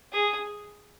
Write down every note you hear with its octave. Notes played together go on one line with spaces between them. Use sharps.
G#4